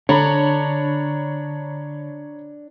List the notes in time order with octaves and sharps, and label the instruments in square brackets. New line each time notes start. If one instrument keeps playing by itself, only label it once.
[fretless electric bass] D3 [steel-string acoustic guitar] D4 [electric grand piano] C#5 A#5 B5